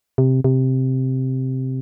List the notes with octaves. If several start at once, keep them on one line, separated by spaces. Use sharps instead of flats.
C3
C3